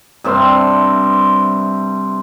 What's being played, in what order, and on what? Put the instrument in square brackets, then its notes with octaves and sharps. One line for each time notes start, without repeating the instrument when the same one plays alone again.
[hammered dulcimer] G2 C3 E5 C6